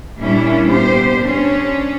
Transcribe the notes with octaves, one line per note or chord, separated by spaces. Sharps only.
A#2 G3 C#4 D4 E4
B3 G4 C5
C#4 D4